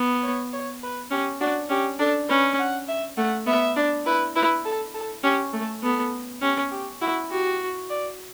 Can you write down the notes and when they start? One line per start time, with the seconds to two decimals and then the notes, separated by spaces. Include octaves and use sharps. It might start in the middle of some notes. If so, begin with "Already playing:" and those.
Already playing: B3
0.23 C#5
0.53 C#5
0.82 B4
1.11 C#4 G4
1.40 D4 F#4
1.70 C#4 G4
1.99 D4 A4
2.29 C#4 B4
2.59 F#5
2.88 E5
3.17 A3 F#5
3.46 B3 E5
3.76 D4
4.06 E4 B4
4.36 E4 B4
4.65 A4
4.94 A4
5.23 C#4 G4
5.53 A3 A4
5.83 B3 A4
6.42 C#4 G4
6.71 G4
7.01 E4 F#4
7.30 F#4 G4
7.90 D5